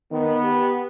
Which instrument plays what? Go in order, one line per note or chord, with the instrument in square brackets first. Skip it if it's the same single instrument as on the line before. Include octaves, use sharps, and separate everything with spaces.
[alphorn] D#3 [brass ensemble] B3
[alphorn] G4